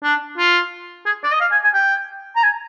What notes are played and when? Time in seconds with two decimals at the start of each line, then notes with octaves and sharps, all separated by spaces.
0.03 D4
0.38 F4
1.06 G#4
1.24 D5
1.32 D#5
1.41 F5
1.52 G#5
1.64 G#5
1.74 G5
2.36 A#5
2.43 G#5